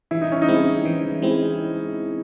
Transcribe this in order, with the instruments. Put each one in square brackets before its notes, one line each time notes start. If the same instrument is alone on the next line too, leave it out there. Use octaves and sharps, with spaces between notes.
[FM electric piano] E3 [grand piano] E4
[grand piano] D#4
C#4
D#4
[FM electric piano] G#3 C4 E4
E3
G#3 C4 E4